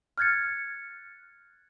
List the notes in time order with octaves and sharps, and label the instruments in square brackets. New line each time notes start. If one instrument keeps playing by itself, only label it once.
[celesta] F6 F#6 G#6 A6 C#7